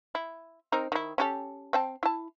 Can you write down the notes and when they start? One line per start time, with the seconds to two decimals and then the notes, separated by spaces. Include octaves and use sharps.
0.15 E4
0.72 C4 D#4 A#4
0.92 D#3 E4
1.18 C#4 G4 A4
1.73 C4 G5 A5
2.03 E4 A5